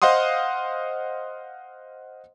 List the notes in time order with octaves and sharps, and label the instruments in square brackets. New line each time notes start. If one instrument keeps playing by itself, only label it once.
[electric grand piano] C5 D#5 F5 F#5 C6 D#6